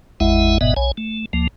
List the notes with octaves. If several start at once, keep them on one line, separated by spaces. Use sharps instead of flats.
G#1 E2 G#3 E4 E5 F#5
G1 G#2 B2 B3 D#5 E5
B1 C#5 G#5
A3
D2 F3 A#3